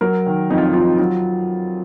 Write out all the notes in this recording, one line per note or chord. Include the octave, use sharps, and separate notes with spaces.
F#3 A#4
D#3
F2 D#4
F4
D#4
F2 F4
D#4
F#3 F4